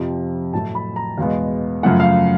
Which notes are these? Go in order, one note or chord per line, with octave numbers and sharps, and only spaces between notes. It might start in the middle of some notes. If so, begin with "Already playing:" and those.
Already playing: F2 C3 F3
A2 F#3 A3 A5
B5
A#5
E2 B2 G#3 B3 F5
F#2 C#3 F3 A3 F#5
F5